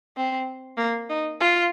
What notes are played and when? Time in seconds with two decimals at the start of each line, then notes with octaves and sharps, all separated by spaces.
0.17 C4
0.78 A#3
1.10 D#4
1.40 F4